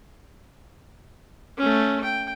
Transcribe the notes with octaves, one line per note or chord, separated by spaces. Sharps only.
A3 C#4
G5